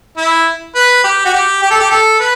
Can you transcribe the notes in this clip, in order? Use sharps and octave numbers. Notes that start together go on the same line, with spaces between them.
E4
B4
G4
F#4
G4
G4
A4
G4
A4
B4